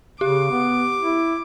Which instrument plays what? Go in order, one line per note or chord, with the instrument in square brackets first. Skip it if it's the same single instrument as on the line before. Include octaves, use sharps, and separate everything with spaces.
[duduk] C#3 [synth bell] G4 [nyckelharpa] D6
[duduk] B3
E4